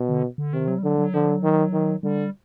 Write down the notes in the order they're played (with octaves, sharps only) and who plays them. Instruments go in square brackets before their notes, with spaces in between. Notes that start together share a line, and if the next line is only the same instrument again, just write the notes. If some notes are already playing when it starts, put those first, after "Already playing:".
Already playing: [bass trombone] B2
[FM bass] D3
D3
[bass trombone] C3 [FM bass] D#3
[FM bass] F#3
G3
[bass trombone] D3 [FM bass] F#3
[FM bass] F#3
[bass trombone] D3 [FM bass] F3
[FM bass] F#3
[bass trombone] D#3
D#3
[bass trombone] D3 [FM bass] G3